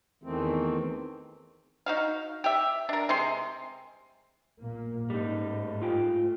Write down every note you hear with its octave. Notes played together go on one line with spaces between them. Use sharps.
E2 D#3 E3 A3 C4
D#4 F#4 F5
G4 E5
D4 A#4
C3 G#3 C6
A#2 A#3
G#2 G3 A3 D#4
F4 G5 G#5